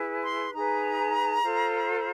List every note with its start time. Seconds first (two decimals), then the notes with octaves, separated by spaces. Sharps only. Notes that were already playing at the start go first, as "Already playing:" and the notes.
Already playing: E4 G#4 B4
0.24 C6
0.53 D#4 G#4 B4 A#5
1.42 F4 A4 C5